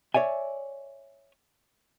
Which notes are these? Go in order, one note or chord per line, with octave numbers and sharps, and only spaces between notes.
C#5 D5 E5 G#5